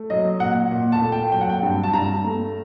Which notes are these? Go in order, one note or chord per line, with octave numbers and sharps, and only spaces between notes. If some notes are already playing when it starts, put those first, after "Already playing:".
Already playing: A3
F#3 D#5
A#2 F#5
A#2
A5
A3
G5
F#3 G5
F#5
G5
G2
A5
G2 A#5
A3